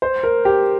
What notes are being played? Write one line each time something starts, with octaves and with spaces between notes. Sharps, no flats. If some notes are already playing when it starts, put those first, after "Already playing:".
C5
A#4
G4